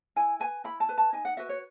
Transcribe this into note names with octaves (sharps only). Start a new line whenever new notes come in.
E4 G#5
B4 G#5
E4 B5
A5
B4
A5
D#4 G#5
F#5
F#4 B4 E5
C#5